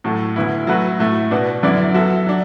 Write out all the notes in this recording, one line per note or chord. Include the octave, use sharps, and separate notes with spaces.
A2 F#3 A3 F#4 A4
D2 D3 B3 E4
F#3 A3 F#4 B4
A2 A3 F#4
B2 B3 D4 F#4
F#2 D3 B3 E4 D5
F#3 B3 F#4 A4 E5
F#3 D4